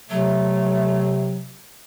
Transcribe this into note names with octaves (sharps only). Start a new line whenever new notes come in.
C3 F#3 A3